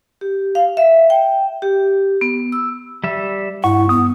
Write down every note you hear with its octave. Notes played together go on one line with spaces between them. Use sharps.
G4
F5
E5
G5
G4
B3
E6
G3 E5
G2 E4 F#5 C#6
B3 D#6